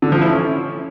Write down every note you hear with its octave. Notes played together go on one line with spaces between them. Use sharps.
D3
F3
E4
C#4